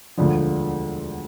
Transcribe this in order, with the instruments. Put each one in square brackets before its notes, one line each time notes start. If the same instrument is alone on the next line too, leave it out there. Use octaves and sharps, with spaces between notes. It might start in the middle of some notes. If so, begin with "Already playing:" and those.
[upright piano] E1 D2 D3 F3